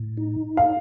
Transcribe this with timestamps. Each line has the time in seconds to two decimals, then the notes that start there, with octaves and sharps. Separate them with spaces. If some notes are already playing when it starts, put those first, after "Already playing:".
Already playing: A2
0.17 D#4
0.57 F5